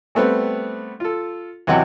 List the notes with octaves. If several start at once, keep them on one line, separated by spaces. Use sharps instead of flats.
G3 A3 B3 C4
F4 A4
E2 C3 F#3 D#5 F#5 G5